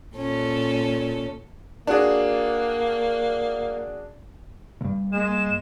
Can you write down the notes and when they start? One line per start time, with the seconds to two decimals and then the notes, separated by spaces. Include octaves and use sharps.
0.15 A#2 C#4 A4
1.87 A#3 D4 F#4 G#4
4.81 C#2 G2
5.13 G#3 A#3 E7